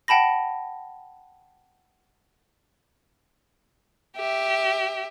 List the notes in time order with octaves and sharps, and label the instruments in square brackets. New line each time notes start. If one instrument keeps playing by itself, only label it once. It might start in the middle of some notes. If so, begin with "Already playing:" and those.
[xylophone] F#5 G5 A5 B5 A#6
[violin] G4 E5